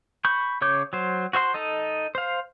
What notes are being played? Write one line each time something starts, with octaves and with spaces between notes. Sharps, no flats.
B5 C#6 G6
C#3 C#5 D6 G6
F#3 C5
F#4 C5 E5 C6
D#4 A4 D#5
C5 F5